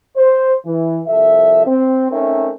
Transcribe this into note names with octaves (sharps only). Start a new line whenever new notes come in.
C5
E3
C2 F3 A4 E5
C4
A3 C4 C#4 D#4 A#4 E5